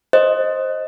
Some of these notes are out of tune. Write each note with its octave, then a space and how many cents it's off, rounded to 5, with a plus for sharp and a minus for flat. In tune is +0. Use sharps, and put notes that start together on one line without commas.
C5 +10 D#5 +0